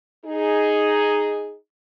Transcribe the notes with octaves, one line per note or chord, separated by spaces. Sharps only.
D#4 G#4